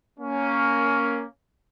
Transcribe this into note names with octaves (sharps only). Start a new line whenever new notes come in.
A#3 C#4